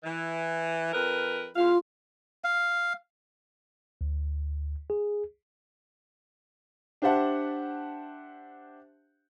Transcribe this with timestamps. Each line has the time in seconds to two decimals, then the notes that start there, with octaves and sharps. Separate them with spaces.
0.04 E3
0.93 F2 A#4 B4
1.56 E2 F4 F5
2.44 F5
4.01 D2
4.90 G#4
7.02 D4 G4 C5 E5 F#5 A5